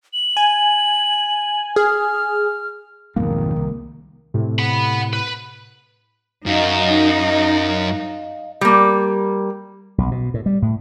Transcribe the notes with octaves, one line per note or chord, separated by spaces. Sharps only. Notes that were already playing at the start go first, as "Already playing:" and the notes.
F#7
G#5
G#4 F6
B1 F2 G#2 D#3 A#3
C2
A2 C3
F#5 B5
B4
F#2 D#4 D#5 F5
G3 A#3
B1
B2
A2
G3
A2